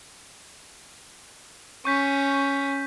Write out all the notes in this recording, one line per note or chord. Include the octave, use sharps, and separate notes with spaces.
C#4 C#6 G6 B6